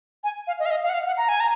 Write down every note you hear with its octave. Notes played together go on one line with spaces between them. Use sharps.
G#5
F5
D#5
F5
D#5
F5
F#5
F5
F#5
A#5
G#5
A#5